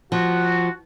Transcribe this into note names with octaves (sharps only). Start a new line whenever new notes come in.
F3 F#4